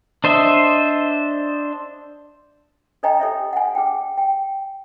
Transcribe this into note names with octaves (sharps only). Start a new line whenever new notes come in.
D4 C5 D#5 E5
A4 C#5 D#5 G5 G#5 A#5
G4 A4 C#5 E5
F#5 G#5
G#4 G5
G5